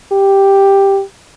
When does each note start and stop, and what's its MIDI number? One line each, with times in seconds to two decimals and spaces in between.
0.12 1.01 67